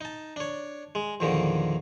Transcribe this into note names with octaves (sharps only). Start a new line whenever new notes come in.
D#4 A5
D4 C#5
G#3
E2 A#2 D3 D#3 F3